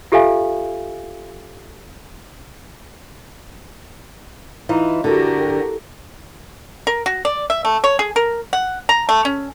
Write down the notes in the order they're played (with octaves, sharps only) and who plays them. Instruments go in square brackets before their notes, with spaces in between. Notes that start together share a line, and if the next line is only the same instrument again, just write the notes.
[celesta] F4 G4 A4 E5 F5 G#5
[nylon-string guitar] E3 D#4 F4
[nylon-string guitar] D3 [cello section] F#4 G4 A#4
[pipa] A#4
F#4
D5
E5
A3
C#5
G#4
A#4
F#5
A#5
A3
C#4